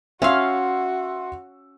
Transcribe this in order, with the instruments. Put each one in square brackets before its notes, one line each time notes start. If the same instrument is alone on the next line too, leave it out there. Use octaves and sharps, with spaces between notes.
[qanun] C#4 F5 [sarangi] F#4 [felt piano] E5 C6 E6